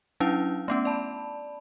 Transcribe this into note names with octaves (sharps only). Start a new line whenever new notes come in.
F#3 C#4 D4 E4 F5
A3 B3 C#4
D5 A5 B5